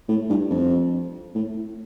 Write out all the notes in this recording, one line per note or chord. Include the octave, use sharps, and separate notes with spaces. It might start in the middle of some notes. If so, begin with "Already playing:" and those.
A2
G2
F2
A2